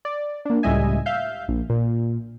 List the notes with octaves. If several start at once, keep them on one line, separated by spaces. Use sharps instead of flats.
D5
A#3 D4
C#2 A2 G3 D#5 E5 G#5
E5 F5 G6
A#1
A#2